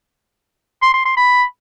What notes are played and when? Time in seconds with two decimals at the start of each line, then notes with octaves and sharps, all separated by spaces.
0.82 C6
0.94 C6
1.05 C6
1.17 B5